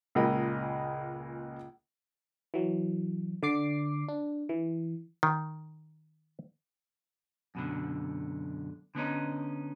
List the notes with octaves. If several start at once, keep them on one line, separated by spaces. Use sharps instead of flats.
C#2 A#2 G#3 A#4 D#5 B5
E3 F#3
D3 D5 D6 C7
D4
E3
D#3
F#2 B2 D3
D3 B3 C#4 D#4